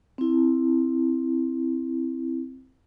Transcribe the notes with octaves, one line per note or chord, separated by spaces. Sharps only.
C4 E4